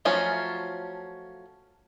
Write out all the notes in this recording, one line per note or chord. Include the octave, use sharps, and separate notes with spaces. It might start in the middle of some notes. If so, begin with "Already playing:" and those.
F3 F#3 A3 C#4 F4